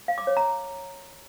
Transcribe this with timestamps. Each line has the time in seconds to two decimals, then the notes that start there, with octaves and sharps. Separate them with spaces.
0.08 F5
0.18 D6
0.27 C#5
0.37 A#5